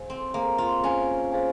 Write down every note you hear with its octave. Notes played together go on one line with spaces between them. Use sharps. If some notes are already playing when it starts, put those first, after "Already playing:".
Already playing: G#4 C5 F5 G#5
C4
A#3 G#4 C5 F5 G#5
F4
C#4 G#4 C5 F5 G#5
G#4 C5 F5 G#5